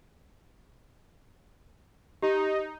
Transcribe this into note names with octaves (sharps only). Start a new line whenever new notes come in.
D#4 G4